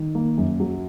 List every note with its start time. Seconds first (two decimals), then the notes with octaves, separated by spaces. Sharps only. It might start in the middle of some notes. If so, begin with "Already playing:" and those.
Already playing: D#3
0.15 A#3
0.38 F#2
0.60 F#3